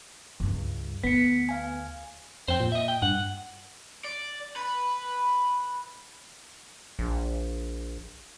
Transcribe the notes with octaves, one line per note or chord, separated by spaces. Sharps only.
C#2 G2
D2 B3 B6 C#7
F5 G#5
F2 C5 G5
A#2
D#5 E5
G5
G2 F#5
D5
B4
A#1